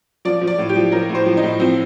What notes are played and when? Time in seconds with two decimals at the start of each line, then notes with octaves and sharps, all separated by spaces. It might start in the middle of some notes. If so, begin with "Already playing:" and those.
0.25 F3 D5
0.41 F3
0.47 D5
0.58 A2
0.69 G4
0.76 F3
0.92 F3 A#4
1.09 A2
1.15 C5
1.26 F3
1.37 D#4
1.43 A2
1.60 F3 C4